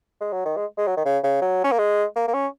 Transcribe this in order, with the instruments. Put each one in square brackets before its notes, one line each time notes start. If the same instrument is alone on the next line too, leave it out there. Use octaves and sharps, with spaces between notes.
[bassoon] G#3
F#3
D#3
G#3
G#3
F#3
D#3
C#3
C#3
F#3
C#4
A#3
G#3
A#3
A#3
C#4